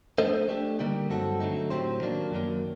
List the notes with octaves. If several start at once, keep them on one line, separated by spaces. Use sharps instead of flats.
A3 D4 A4 C5 D#5
A3 D4 G4
D3 G3 A#3 D#4 G4
G2 F#3 C4 F#4 A4
D3 F#3 A3 D#4
A2 F#3 C4 G4 C5
D#3 F#3 A#3 D4
F#2 D#3 F#3 A#3